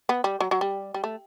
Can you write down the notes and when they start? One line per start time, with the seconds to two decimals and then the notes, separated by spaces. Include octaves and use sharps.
0.09 B3
0.24 G3
0.41 F#3
0.51 F#3
0.61 G3
0.94 G3
1.04 A3